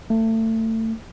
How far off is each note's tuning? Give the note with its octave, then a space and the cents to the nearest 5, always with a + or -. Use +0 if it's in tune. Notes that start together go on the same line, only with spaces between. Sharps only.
A3 +25